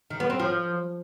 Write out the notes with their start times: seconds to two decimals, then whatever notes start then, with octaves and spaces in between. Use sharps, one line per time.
0.10 D#3
0.20 B3
0.30 C4
0.39 F3